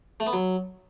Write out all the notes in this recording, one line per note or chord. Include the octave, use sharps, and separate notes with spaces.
A3
B3
F#3